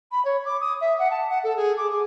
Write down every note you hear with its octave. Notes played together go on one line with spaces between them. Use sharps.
B5
C#5
D6
D#6
E5
F#5
A5
F#5
A4
G#4
D6
G#4